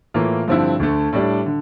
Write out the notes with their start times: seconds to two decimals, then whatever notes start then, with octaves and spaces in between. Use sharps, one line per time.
0.14 A2 E3 A#3 F4
0.47 G2 D3 F3 C4 E4
0.79 D2 D3 A3
1.12 A2 G3 D4
1.46 D3